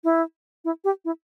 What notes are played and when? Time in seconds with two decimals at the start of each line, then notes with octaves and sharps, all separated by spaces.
0.04 E4
0.65 E4
0.84 G4
1.05 E4